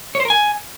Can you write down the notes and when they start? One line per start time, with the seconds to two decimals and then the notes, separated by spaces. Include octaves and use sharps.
0.15 C#5
0.20 C5
0.25 A#4
0.30 G#5